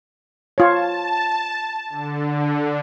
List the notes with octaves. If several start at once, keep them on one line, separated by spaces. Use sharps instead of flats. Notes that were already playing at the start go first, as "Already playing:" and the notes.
F4 C#5 A5
D3